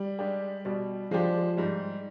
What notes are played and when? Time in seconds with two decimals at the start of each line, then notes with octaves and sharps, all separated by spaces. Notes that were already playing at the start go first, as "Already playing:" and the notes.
Already playing: G3
0.19 G#3 D4 G4
0.65 B2 G3
1.11 F3 G#3 D4 G4
1.57 G#2 G3